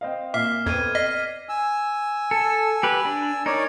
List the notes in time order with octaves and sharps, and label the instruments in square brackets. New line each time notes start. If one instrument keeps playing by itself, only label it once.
[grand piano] C4 D#5 F5
[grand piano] A#2 [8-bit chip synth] E5 [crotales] D6 F6 C7
[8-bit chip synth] F2 [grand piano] B3 C4 A4 [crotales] G#6 D#7
[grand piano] D5 B6 [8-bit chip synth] D#5 [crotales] C7
[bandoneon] G#5 E6
[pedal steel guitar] A4
G4 B4
D4
[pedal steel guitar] D#4 A#4 [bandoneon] C#5 D5